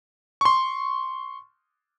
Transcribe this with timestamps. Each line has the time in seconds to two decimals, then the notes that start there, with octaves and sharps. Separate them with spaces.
0.41 C6 C#6